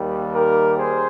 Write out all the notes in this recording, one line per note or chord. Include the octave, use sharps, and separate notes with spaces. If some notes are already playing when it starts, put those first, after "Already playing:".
Already playing: D#2 D#3 G3
G4 A#4
G#4 C5